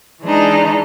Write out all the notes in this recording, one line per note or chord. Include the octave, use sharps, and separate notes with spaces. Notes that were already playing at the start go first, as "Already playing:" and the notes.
E3 G#3 D4 D#4